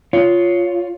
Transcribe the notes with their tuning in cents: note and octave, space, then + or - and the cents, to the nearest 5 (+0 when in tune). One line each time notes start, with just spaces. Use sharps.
F4 +0 C#5 +10